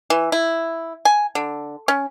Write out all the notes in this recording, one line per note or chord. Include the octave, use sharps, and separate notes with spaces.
E3
E4
G#5
D3
C#4